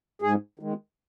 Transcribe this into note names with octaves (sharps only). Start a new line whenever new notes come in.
G#2 G#4
D#3 G#3